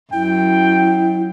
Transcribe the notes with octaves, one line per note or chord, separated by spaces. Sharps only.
F#2 E4 G5